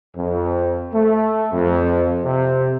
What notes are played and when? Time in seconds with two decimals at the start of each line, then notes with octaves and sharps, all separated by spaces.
0.16 F2
0.93 A3
1.52 F2
2.24 C3